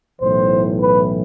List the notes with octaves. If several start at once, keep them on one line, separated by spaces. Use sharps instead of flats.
B1 A2 E3 C5
B4